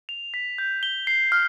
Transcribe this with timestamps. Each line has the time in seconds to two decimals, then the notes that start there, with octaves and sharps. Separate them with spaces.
0.09 F7
0.34 B6
0.58 G6
0.83 G7
1.07 C7
1.32 F6